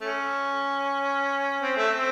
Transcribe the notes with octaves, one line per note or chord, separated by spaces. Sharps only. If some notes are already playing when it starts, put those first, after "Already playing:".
A3 C#4
C4
A3
C4